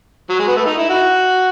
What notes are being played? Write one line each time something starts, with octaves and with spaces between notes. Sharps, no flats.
F#3
G#3
B3
A3
D#4
E4
F#4